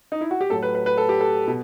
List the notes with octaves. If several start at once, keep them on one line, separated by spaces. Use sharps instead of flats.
D#4
E4
F#4
G4
A2 F#3 A4
B4
B4
B4
A4
G4
A4
B2